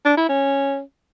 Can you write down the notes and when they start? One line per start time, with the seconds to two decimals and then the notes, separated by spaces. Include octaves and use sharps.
0.05 D4
0.17 E4
0.29 C#4